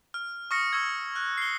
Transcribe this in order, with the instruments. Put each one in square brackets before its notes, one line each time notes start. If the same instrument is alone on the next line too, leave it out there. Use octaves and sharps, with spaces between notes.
[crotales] F6
C#6 D#6 F6 A#6 C#7
C#6 D#6 E6 G#6
F6 F#6
C7 G7